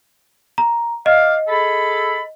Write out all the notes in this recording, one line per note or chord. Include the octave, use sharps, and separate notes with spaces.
A#5
D5 D#5 F5
G#4 A4 B5